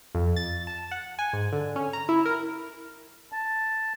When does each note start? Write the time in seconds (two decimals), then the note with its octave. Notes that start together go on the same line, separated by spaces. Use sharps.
0.15 F2
0.36 A6
0.67 A5
0.91 F#5
1.19 G#5
1.33 G#2
1.52 D3
1.76 C#4
1.93 A#5
2.09 E4
2.25 A#4
3.32 A5